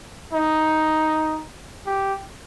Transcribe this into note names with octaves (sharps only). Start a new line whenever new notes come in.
D#4
G4